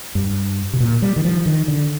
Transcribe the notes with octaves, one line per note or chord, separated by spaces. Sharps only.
G2
C3
A#2
G3
D#3
F3
D#3
D3